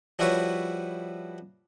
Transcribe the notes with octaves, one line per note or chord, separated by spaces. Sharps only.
F3 G3 E4 F#4 B4 C#5